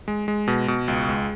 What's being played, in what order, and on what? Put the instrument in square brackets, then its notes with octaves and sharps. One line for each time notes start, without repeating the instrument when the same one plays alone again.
[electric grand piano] G#3
G#3
B2
B2
C#2
G#3